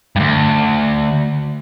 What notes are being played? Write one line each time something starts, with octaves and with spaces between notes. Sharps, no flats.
D2 G2